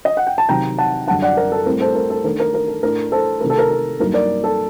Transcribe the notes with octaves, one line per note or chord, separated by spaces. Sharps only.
D#5
F#5
G5
A5
C3 D#3 F#3 C4 G5 A#5
F#5 A5
F#2 D3 G3 D4 F#5 A5
D5 F#5
A#4
A4
A2 G3 C4 A#4
A4 C5
A#4
A4
D#3 A3 D4 A#4
A#4
A#4
A4
A2 A3 D4 A#4
A4 C5
C3 D#3 A3 A#4
A4
A#4
A4
G2 F#3 A#3 D#4 A#4
A#4 D5
A4